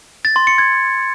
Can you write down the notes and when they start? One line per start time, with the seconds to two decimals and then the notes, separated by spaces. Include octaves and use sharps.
0.25 A6
0.36 C6
0.47 C#7
0.58 G#6